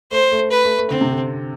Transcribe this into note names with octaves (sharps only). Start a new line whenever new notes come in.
A3 C5
A3
B4
A3
A3
D3 C4
C3
D3